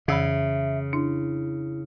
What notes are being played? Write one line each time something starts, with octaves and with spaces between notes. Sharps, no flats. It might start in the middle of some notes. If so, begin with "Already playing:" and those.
F2 C#3 E3 E5 B5
D4 E4